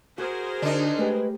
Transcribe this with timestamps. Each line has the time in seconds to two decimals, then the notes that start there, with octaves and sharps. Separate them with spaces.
0.18 F#4 G#4 A#4 C5 F#5
0.62 D3 D4 D#4
0.99 G#3 A3 G4 B4